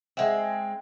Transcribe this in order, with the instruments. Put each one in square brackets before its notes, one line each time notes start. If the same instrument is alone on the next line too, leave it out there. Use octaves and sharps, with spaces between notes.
[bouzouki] G#3 C4 [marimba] E5 F#5